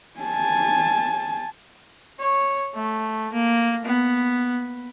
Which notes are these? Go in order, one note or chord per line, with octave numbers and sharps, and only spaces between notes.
G#5 A5
C#5
A3
A#3
B3